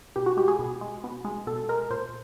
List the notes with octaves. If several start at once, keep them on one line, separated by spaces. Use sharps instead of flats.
B2 G4
F#4
G#3 G4
G#4
B2
G#3
B2
G#3
B2 A4
G#3 A#4
A#2 C5